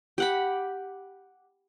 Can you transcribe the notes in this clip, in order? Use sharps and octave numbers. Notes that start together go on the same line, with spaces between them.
G4 F#5 B5